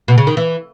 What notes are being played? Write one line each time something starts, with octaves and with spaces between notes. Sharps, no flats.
B2
C#3
D#3
E3